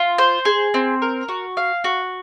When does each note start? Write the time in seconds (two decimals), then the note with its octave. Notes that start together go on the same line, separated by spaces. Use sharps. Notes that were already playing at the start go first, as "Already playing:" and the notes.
Already playing: F4
0.18 C5
0.45 G#4
0.74 C4
1.02 A#4
1.29 F#4
1.57 F5
1.84 F#4